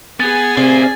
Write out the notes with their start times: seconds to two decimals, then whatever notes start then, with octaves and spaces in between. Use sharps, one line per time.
0.20 B3 G#4 G#5 A6
0.57 C3 D5 F5